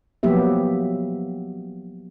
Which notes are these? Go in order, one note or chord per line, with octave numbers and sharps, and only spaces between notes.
F3 F#3 A#3 B3 G4 E5